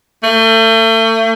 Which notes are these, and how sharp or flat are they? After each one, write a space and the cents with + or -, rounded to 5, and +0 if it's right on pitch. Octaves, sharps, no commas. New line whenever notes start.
A3 +35